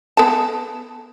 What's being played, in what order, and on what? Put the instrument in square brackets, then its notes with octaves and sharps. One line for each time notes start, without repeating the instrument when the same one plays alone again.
[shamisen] B3 A4 A5